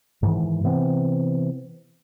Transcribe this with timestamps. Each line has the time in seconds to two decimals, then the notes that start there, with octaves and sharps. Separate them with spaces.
0.23 G#2 D#3 E3
0.64 C3 E3 B3 C4